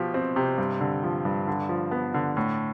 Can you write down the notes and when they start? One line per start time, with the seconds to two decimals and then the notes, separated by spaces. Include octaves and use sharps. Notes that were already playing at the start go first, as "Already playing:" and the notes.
Already playing: B2 F3 G4
0.14 C4
0.36 C3
0.58 G2
0.81 D3
1.03 F3
1.25 G2
1.48 D3
1.69 F3
1.91 B3
2.14 D3
2.37 A2